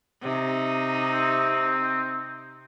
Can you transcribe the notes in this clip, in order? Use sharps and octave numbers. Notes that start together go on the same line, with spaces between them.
C3 D#4
C4